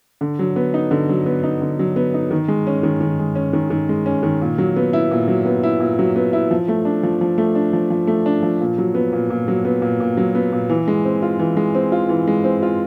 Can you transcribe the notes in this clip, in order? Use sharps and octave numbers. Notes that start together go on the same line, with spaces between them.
D3
F#3
B3
D#4
D3
F#3
B3
D#4
D3
F#3
B3
D#4
D#3
G#3
C#4
D#3
D#3
G#3
C#4
D#3
D#3
G#3
C#4
D#3
A#2
F#3
B3
E4
A#2
F#3
B3
E4
A#2
F#3
B3
E4
F3
A3
D4
F3
F3
A3
D4
F3
F3
A3
D4
F3
A#2
F#3
B3
A#2
A#2
F#3
B3
A#2
A#2
F#3
B3
A#2
E3
G#3
C4
F4
E3
G#3
C4
F4
E3
G#3
C4
F4